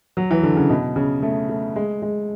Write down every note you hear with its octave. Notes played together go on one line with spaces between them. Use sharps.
F#3
E3
D3
C#3
B2
C#3
A3
A3
G#3
G#3